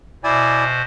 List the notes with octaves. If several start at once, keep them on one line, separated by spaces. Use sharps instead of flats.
B2 E4 C5 D5 G#5